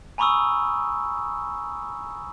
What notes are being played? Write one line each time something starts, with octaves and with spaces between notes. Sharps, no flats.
G#5 A#5 B5 C#6 D#6 E6